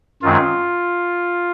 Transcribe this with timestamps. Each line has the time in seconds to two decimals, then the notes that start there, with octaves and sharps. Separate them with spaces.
0.22 F#2 D#3 G#3 C4 F4